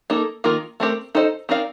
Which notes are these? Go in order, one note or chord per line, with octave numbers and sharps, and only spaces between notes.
A#3 D#4 A4
D#3 A#3 F4 A#4
A3 C4 G4 A#4
D#4 A4 C5 D#5
C4 D#4 A#4 D5 F5